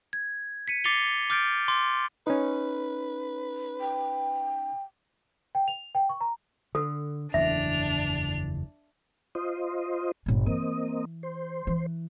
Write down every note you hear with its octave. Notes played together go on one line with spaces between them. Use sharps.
G#6
B6 C#7 D#7
D6 A6 C7 C#7 F7 G7
D6 F6 G6 A6 D7
C6 D6
C#4 D#4 B4
G5
G5
F7
G5
C#6
A#5
D3 A4
F#1 E2 E3 D4 E5 F7
F4 C5 D#5
G1 A#2
E3 A#3 C4 D#5
C5
E3